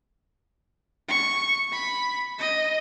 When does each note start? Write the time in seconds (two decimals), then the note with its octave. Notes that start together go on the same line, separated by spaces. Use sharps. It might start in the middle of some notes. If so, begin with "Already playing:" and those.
1.09 C#6
1.73 B5
2.39 D#5